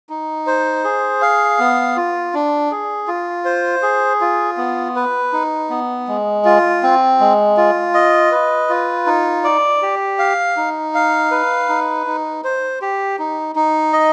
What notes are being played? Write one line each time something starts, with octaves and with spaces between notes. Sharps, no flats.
D#4
C5
G#4
F5
B3
F4
D4
G#4
F4
C5
G#4
F4
B3
B4
D#4
B3
G#3
F4
C4
G#3
F4
D#5
B4
F4
D#4
D5
G4
F5
D#4
F5
B4
D#4
D#4
C5
G4
D#4
D#4
D#5